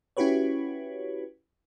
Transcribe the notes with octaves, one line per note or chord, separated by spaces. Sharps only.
C#4 E4 F#4 G4 B4 C#5